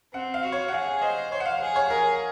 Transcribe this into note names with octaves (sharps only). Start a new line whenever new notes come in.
C4 F#5
F5
F#4
C#5
F#5
G#4 F5
C5 D#5
C5 C#5
F#5
F5
G#4
C#5
G#4 A#4